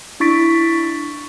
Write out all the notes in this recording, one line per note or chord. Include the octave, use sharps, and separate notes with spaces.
D4 E4 C#6 A6 B6 D7